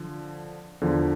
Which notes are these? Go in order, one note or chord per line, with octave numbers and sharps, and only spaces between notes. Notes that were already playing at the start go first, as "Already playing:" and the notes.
Already playing: D3 F3
E2 D3 F3